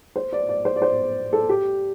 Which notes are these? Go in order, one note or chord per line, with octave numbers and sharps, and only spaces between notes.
C5
D5
D5
C5
D5
C5
A4
G4